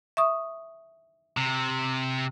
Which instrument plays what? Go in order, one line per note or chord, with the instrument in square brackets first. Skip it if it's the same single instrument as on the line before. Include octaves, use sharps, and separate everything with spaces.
[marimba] E5 C#6 D#6
[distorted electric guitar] C3